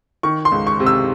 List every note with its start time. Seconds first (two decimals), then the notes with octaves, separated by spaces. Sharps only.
0.23 D#3 C#6
0.45 C6
0.52 C#2
0.67 C#6
0.80 C3
0.87 E6